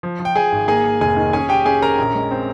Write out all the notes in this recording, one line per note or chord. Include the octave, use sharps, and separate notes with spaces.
F3
F3
G5
F3 G#4 G#5
G#1
A#3 G#4 G#5
A#3
F1 G#4 G#5
D#3
C#4 G#4 G#5
C#4 G4 G5
C#4 G#4 G#5
C#4 A#4 A#5
A#1
G#3
C4